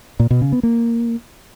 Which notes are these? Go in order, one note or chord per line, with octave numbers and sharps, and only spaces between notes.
A#2
B2
C#3
B3
A#3